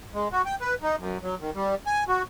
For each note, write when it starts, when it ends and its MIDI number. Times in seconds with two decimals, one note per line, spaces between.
0.14 0.28 56
0.32 0.42 66
0.46 0.55 79
0.61 0.75 71
0.82 0.96 63
0.99 1.18 42
1.23 1.35 54
1.41 1.50 51
1.55 1.75 55
1.86 2.04 80
2.08 2.22 66